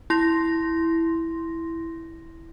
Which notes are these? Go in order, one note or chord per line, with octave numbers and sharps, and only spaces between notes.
E4 C6 A#6